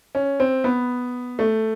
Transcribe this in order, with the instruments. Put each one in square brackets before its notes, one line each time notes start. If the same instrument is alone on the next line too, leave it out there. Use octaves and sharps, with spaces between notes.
[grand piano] C#4
C4
B3
A3